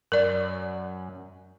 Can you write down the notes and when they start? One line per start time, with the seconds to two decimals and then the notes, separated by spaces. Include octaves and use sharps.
0.12 F#2 A#4 D5